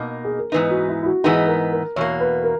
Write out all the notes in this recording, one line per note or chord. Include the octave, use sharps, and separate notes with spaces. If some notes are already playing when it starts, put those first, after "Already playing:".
Already playing: B2 A#3 D#4
G#4
A#4
G#2 E3 B3 D#4 B4
F#4
E4
E4
F#4
G#2 E3 B3 D#4 G#4
A#4
A#4
E2 B2 A#3 C#5
B4
A#4